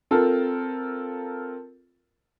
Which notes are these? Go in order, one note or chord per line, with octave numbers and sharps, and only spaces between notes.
C4 F4 A4 A#4